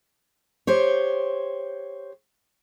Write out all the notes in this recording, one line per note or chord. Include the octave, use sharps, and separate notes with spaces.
G4 C5 C#5